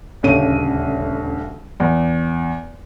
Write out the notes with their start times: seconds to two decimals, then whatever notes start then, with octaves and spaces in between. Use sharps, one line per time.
0.23 D#1 D2 C#3 C#5 D#7
1.80 E2